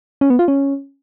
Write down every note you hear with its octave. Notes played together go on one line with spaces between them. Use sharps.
C#4
B3
F4
C#4